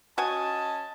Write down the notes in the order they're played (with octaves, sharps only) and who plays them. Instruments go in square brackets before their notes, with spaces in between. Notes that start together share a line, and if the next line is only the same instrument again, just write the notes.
[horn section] C#4 D#5 A5 [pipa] F#4 G#5